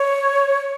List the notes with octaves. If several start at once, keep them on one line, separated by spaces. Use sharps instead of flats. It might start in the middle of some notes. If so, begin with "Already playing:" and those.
Already playing: C#5